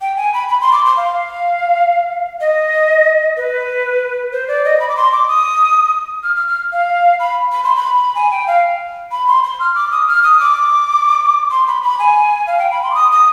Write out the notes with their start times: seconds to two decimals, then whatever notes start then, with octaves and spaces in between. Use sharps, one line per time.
0.01 G5
0.17 G#5
0.34 B5
0.48 B5
0.61 C6
0.73 D6
0.85 C6
0.97 F5
2.41 D#5
3.37 B4
4.32 C5
4.48 D5
4.65 D#5
4.80 B5
4.89 D6
4.97 C6
5.12 D6
5.28 D#6
6.23 F6
6.36 F6
6.48 F6
6.73 F5
7.20 B5
7.52 B5
7.64 C6
7.76 B5
8.15 G#5
8.31 G5
8.47 F5
9.11 B5
9.28 C6
9.44 C6
9.60 F6
9.75 D6
9.92 D#6
10.08 F6
10.23 D#6
10.40 D6
11.51 C6
11.67 B5
11.83 B5
11.99 G#5
12.47 F5
12.59 G5
12.71 B5
12.83 C6
12.91 D6
12.94 D#6
13.12 D#6